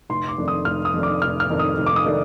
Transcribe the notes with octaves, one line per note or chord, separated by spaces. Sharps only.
F1 C6
D6
F2 D#3 A3 D4
D#6
F1 F6
D#6
F2 D#3 A3 D4
D6
F1 F6
F6
F2 D#3 A3 D4
D#6
F1
D6
D#6
D#3 A3 D4